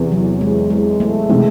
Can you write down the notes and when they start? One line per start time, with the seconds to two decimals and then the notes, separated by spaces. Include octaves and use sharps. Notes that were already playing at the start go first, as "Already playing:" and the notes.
Already playing: E2 C3 E3
0.12 F#3
0.41 G#3
0.70 G#3
1.00 A3
1.29 C3 E3 G#3 A3 C4